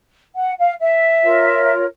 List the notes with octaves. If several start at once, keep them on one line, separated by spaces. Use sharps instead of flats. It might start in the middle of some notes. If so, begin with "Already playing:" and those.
F#5
F5
E5
F4 A#4 C#5